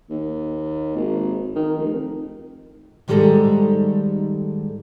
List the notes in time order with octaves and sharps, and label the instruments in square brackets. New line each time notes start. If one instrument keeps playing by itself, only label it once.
[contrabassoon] D#2
G#1
D#3
F1
[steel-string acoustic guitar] G#2 D#3 G3 G#3 A4 A#5